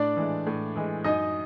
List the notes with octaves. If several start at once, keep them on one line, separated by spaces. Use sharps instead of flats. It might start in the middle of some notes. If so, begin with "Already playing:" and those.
Already playing: A2 D4 D5
E3 G#3
A2
E3 G#3
F#2 D#4 D#5